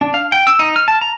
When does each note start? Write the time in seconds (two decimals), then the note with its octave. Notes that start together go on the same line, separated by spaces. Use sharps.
0.01 D4
0.14 F5
0.32 G5
0.47 E6
0.59 D#4
0.76 F6
0.88 A5
1.01 A#5